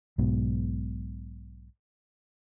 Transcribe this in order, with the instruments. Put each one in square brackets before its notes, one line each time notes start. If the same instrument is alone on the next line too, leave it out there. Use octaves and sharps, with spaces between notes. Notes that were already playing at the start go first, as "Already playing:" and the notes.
[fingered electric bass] B1 G#2 B2